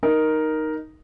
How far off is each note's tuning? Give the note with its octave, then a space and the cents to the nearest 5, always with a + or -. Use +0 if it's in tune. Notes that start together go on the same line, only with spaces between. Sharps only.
D#4 +0 A#4 +5